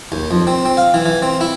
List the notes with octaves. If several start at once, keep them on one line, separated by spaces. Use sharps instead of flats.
D#2
F2
C4
C4
F5
E3
E3
C4
E4